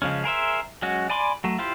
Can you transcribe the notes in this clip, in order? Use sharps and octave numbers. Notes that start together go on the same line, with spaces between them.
C#3 F3 G#3 C#4
G#4 A#4 C5 E5
F#3 G#3 C#4 F#4
D5 G#5 B5 C6 D6
F#3 A3
E4 F4 G4 C5